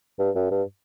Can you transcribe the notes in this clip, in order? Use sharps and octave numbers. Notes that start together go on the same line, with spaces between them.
G2
F#2
G2